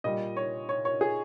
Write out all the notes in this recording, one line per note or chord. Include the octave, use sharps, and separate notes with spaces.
A#2 G3 D#5
C#5
C#5
C#5
G#4